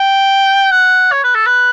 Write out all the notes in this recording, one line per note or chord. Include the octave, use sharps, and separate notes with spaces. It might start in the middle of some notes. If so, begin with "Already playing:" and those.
Already playing: G5
F#5
C#5
B4
A4
B4